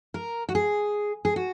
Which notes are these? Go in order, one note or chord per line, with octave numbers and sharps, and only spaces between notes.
A#4
F#4
G#4
G#4
F#4